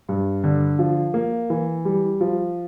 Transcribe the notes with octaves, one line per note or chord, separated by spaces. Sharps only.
G2
D3
F3
A#3
E3
G3
F3